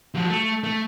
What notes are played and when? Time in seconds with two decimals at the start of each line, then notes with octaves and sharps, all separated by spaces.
0.14 F3 F#3
0.30 A3
0.64 A3